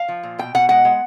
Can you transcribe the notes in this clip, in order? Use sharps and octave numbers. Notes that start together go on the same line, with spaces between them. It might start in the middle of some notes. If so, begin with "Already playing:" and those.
Already playing: F5
F3
A#2
B2 G5
B2 F#5
G#3 F#5
G#3